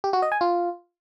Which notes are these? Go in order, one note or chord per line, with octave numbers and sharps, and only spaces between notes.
G4
F#4
D#5
G#5
F4